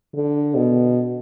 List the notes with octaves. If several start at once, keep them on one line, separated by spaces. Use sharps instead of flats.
D3
B2